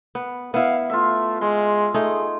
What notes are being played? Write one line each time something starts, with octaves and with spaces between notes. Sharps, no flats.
B3
B3 E4 F5
A3 F4 E5
G#3 C6
A3 D#4 G#4